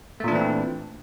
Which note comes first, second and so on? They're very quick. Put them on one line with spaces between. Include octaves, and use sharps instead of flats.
A3 A#2 D4 E3 C4